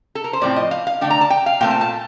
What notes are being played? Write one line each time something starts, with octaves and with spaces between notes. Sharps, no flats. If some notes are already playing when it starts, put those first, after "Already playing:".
A4
A#4
C5
A2 F3 C4 D5
D#5
F5
F5
D3 A3 D4 G5
A#5
A5
G5
F5
A#2 A3 C4 G5
A5
A5